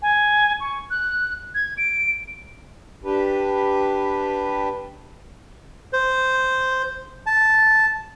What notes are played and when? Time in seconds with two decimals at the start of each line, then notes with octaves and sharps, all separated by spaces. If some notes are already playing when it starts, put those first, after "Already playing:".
0.02 G#5
0.60 C#6
0.91 F#6
1.55 G#6
1.78 D7
3.04 D4 G4 B4
5.93 C5
7.26 A5